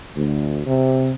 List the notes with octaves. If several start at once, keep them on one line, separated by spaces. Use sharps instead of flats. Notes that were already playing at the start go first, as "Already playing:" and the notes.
D2
C3